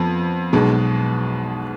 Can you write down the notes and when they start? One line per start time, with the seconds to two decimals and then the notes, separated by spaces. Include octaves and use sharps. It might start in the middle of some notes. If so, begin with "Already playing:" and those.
Already playing: F2 B3
0.53 B1 B2 G#3 B3